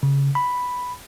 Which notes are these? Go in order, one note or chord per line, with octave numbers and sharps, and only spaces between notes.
C#3
B5